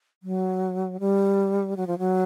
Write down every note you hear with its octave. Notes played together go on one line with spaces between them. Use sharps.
F#3
G3
F#3
F3
F#3